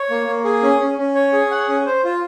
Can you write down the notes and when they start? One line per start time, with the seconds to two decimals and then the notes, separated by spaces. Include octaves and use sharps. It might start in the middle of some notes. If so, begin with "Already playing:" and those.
Already playing: C#5
0.10 A#3
0.27 A#3
0.45 G#4
0.63 C#4
0.80 C#4
0.98 C#4
1.15 C#5
1.33 G#4
1.51 F#5
1.69 C#4
1.86 C5
2.04 F4